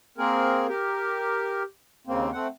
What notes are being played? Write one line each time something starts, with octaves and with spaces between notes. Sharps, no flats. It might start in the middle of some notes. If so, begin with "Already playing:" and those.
A#3 C4 G#4 A#4
G4 A#4
D#2 C#3 A#3 C4
A3 C4 F#5